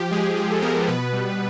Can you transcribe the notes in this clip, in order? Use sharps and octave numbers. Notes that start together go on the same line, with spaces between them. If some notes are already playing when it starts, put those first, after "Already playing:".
Already playing: F3 G4
G#3 G#4
F3 G4
A4
B3 A#4
A#4
B2 B4
G3